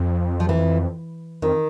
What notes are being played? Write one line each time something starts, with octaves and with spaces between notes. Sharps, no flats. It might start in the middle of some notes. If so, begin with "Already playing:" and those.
Already playing: F2
F3
E3
F2 D#3